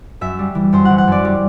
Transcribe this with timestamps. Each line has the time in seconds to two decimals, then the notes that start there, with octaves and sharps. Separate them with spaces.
0.21 F#2 E5
0.39 G3
0.55 E3
0.73 F#2 C5
0.85 E3 F#5
0.98 F#5
1.07 F#2 D5
1.25 G3